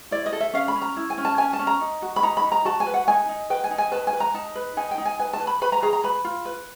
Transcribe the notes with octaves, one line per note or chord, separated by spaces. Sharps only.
E4 D5
D#5
A4
E5
C#4 F5
B5
C#4
A#5
E4
G#5
C#4
A5
C#4 G#5
A5
C#4
A#5
D#4
F#4
B5
D#4 A#5
B5
D#4
A#5
F#4 A5
G#5
B4
F#5
D#4 G#5
D#4
B4 G5
G#5
D#4
G#5
B4 A5
G#5
B4
A#5
D#4 A5
B4
D#4 G#5
G5
D#4
G#5
B4 G#5
A5
B4
B5
B4 B5
A#5
G#4 A#5
A#5
B4 B5
F4
B4